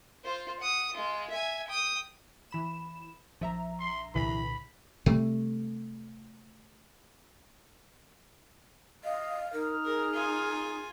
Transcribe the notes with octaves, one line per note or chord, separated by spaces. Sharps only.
F4 C5
F#5 D#6
G#3 F4
E5 G#5
G5 D#6
E3 B5 E7
A#1 F3 E5 A#5
C6
C2 A#2 D3 E3 B5
C3 G3 A3
D#5 F5
D#4 A#4 F6
G#4 A#4
F4 G#5